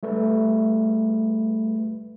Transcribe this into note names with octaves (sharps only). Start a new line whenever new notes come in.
G3 A3 B4